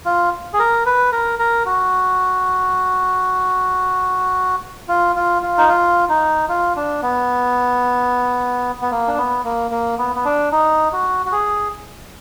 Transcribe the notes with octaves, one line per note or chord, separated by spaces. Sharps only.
F4
G#4
A#4
B4
A#4
A#4
F#4
F4
F4
F4
D#4
F4
D#4
F4
D4
B3
B3
A#3
D4
B3
A#3
A#3
B3
B3
D4
D#4
F#4
F#4
G#4